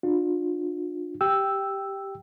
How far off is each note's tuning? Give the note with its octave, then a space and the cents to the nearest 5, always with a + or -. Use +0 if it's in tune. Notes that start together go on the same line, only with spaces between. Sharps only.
D4 +30 F4 +35
G4 +0 G5 +0 E6 +0